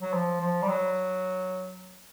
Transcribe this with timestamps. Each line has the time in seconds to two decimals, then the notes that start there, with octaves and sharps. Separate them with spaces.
0.01 F#3
0.14 F3
0.41 F3
0.62 G3
0.69 F#3